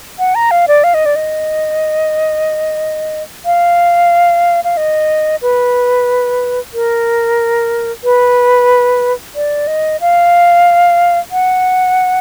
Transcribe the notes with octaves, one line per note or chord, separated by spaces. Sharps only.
F#5
A#5
F5
D5
F5
D#5
D5
D#5
F5
F5
D#5
B4
A#4
B4
D5
D#5
F5
F#5